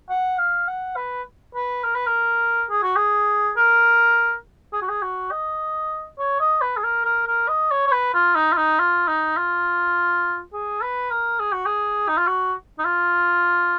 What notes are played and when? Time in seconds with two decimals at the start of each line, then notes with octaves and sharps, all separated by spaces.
0.10 F#5
0.39 F5
0.68 F#5
0.96 B4
1.55 B4
1.84 A#4
1.95 B4
2.07 A#4
2.70 G#4
2.83 F#4
2.96 G#4
3.57 A#4
4.73 G#4
4.82 F#4
4.89 G#4
5.02 F#4
5.31 D#5
6.19 C#5
6.40 D#5
6.62 B4
6.77 G#4
6.84 A#4
7.05 A#4
7.27 A#4
7.49 D#5
7.71 C#5
7.87 C#5
7.92 B4
8.14 F4
8.36 D#4
8.53 F4
8.58 D#4
8.79 F4
9.08 D#4
9.37 F4
10.53 G#4
10.83 B4
11.11 A#4
11.40 G#4
11.53 F#4
11.66 G#4
12.08 D#4
12.18 F4
12.27 F#4
12.79 D#4
12.85 F4